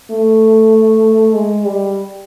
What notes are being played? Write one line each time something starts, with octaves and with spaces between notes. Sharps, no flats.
A3
G#3
G3